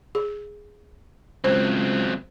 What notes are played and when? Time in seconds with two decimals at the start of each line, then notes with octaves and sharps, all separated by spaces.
0.15 G#4
1.44 C#2 F#3 C4 C5